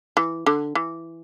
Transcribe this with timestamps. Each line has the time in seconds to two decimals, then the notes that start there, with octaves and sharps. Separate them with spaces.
0.17 E3
0.46 D3
0.75 E3